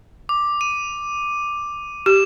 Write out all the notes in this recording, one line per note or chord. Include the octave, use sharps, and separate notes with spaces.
D6
D#7
G4 E7